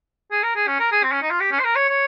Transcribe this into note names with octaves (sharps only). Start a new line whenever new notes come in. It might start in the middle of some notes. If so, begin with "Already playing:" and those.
G#4
A#4
G#4
C#4
A#4
G#4
C4
C#4
D#4
F4
G4
C#4
C5
A#4
C#5
C#5